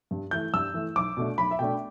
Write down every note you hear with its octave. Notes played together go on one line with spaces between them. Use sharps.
G2
E3 A3 G6
G2 E6
E3 A3
B1 D6
B2 A3 D4
B1 B5
E5
B2 A3 D4 G5